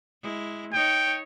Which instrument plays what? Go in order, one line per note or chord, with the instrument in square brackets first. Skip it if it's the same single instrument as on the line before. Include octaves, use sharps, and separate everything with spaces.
[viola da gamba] G#3 E4
[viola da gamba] D#4 C#5 [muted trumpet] G5